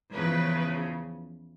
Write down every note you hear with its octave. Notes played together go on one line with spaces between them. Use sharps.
E2 C#3 F3 B4